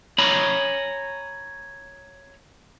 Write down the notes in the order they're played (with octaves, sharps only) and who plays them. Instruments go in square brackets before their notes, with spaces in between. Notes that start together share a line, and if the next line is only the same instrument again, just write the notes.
[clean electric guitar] C#5 G#5 A#5 B5